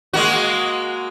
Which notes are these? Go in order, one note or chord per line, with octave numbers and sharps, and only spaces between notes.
G#3 A#3 F#4